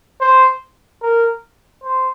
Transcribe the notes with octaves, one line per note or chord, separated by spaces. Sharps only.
C5
A#4
C5